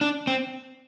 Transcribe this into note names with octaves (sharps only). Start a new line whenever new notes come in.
D4
C4